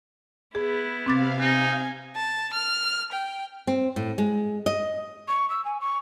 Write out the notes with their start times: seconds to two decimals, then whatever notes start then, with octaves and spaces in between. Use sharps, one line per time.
0.55 B3 E4 G#4
1.06 C3 C4 F5 D6 A6
1.40 D#4 G#5
2.16 A5
2.53 F6
3.12 G5
3.67 C4
3.96 A2
4.18 G#3
4.66 D#5
5.28 C#6
5.50 E6
5.65 G#5
5.80 C#6